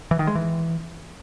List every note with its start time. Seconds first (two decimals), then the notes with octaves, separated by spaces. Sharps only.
0.11 E3
0.19 D#3
0.27 G#3
0.35 E3